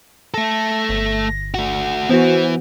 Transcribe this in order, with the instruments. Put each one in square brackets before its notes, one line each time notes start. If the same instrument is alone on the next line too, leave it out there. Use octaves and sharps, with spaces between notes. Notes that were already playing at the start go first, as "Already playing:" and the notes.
[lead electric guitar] A3 A4 [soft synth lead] A#6
[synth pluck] G1
[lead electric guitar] A3 F#4
[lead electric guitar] E3 [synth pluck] B3 F#4 [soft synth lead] C5